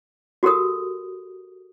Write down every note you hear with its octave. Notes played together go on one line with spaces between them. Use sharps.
F#4 G4 A4 A#4 D#6